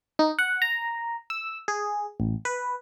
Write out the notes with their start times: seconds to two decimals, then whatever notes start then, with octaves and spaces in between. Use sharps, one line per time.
0.19 D#4
0.39 F#5
0.62 A#5
1.30 E6
1.68 G#4
2.20 A1
2.45 B4